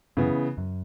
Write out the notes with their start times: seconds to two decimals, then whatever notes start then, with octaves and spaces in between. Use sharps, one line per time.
0.17 F#2 C#3 E3 B3
0.58 F#2